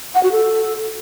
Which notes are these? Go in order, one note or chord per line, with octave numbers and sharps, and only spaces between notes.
F#5
F#4
A4